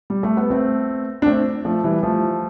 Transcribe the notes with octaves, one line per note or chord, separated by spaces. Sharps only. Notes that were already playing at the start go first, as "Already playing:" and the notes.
G3
A3
B3
A3 C4
D4
A3 C4
F3 A3
E3 G3
F3 A3